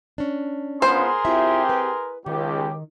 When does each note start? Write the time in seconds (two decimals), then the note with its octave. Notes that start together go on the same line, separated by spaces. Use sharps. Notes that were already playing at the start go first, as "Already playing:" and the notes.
0.18 C#4 D4
0.82 G#1 B3 F4 G#4 A#4 C5 C6
1.25 C4 E4 F4 G4 E5
1.69 B4
2.26 C#2 D#3 G4